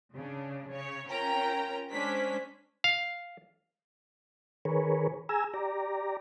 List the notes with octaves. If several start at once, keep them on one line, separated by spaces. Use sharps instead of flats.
C#3 D4
C#3 C#5
C#4 F4 A#4 G5 A#5
G#3 C#4 D4 C5 B6
F5
D#3 G#4 A#4 B4 C#5
G#4 G#5 A#5 E6
G4 D5 A#5